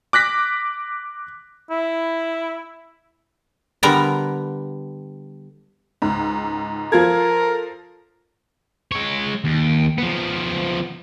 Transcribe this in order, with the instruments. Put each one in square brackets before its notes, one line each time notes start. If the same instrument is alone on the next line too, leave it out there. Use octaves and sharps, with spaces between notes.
[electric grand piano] D6 F#6 A#6 B6
[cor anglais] E4
[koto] D3 G3 B3 A#4 A#5
[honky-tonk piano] C#2 G#2
[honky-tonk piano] F3 F4 G#6 [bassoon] A4 [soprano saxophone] A#4
[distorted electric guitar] G#3 C#5
D#2
F3 B3